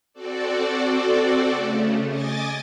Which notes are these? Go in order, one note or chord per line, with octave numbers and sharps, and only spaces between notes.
C4 F#4 A4 D5
C#3 A3
D#5 G#5 D6 A6